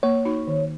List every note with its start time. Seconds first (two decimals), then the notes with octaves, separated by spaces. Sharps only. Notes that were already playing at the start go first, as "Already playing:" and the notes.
0.03 A#3 C#5
0.25 D#4 F#4
0.47 D#3